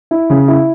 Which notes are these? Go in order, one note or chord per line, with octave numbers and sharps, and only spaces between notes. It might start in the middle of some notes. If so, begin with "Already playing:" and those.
E4
C#3
E4